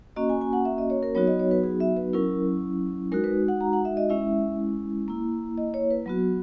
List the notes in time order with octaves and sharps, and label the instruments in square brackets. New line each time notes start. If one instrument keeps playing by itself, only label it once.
[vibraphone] A#3 C#4 F#4 D#5
G#5
G#5
F#5
E5
D#5
C#5
A#4
F#3 B3 D#4 F#4 C#5
D#5
C#5
B4
G#4
E5
B4
F#3 C#4 E4 A#4
G#3 D#4 F#4 A#4
B4
F#5
A#5
F#5
E5
D#5
G#3 C#4 E4 E5
A#3 E4
D#5
C#5
B4
F#3 B3 F#4